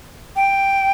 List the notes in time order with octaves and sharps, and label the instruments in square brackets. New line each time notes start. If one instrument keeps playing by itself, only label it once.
[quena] G5